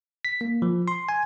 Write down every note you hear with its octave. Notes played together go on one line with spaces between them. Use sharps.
B6
A#3
F3
C6
G#5